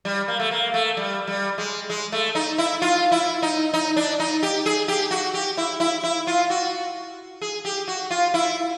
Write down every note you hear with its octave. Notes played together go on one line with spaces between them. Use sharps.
G3
A#3
A3
A#3
A3
G3
G3
G#3
G#3
A3
D#4
E4
F4
E4
D#4
D#4
D4
D#4
G4
G#4
G4
F#4
G4
E4
E4
E4
F4
F#4
G#4
G4
F#4
F4
E4